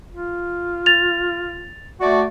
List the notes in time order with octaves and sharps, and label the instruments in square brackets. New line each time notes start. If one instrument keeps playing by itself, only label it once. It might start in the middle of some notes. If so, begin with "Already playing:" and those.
[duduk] F4
[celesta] A6 F7
[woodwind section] A3 F#4 D5